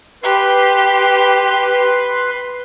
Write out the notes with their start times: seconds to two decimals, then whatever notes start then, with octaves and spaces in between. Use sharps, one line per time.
0.23 G4 B4 C6